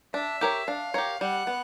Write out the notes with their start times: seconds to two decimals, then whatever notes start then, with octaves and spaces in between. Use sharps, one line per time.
0.14 D4 E5
0.41 G4 A#4 C#5
0.67 D4 F5
0.94 G4 A#4 C#5
1.21 G3 F#5
1.47 B3